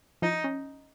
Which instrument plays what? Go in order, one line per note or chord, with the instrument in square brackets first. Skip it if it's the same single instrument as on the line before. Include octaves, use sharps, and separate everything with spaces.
[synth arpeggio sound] F3 [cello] D#4
[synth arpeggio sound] C#4